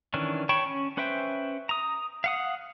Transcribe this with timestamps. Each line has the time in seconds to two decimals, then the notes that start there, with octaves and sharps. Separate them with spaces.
0.14 D#3 E3 C#4 D4
0.49 C#5 G5 A5 B5 C#6
0.66 C#4
0.97 C#4 B4 C5 E5 G5
1.69 A#5 D#6
2.24 F5 F#5 D#6